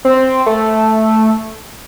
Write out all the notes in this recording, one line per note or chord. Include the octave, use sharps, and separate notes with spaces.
C4
A3